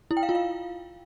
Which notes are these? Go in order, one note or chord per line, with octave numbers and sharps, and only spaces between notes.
E4
G5
F5
F4
F5